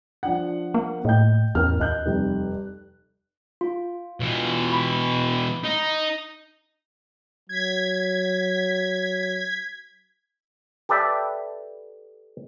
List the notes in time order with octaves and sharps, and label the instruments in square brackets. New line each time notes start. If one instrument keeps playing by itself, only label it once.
[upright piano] F3 D4 F#5
[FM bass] A#3
[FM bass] A2 [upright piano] D#5 G5 G6
[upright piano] A1 A#4 F6 [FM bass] E2
[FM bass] D#2 [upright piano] D#5 F#6 G6
[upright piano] F1 G3
[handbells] F4
[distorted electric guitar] B2 E3
[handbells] B5
[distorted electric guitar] D#4
[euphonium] F#3 [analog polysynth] G#6 B6
[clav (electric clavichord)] G4 A4 B4 D5 E5 G5